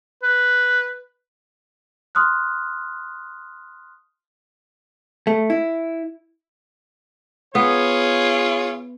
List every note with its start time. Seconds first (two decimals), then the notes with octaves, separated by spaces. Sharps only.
0.23 B4
2.15 C6 D#6 F6 F#6
5.27 A3
5.50 E4
7.55 B3 F4 G#4 C#5